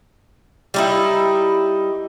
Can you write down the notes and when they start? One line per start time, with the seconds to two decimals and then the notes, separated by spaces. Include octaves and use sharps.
0.74 G3 D#4 E4